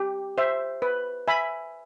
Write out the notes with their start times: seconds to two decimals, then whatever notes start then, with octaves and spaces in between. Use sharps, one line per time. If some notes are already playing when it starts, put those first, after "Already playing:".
Already playing: G4
0.38 C5 E5
0.82 B4
1.28 E5 G#5 B5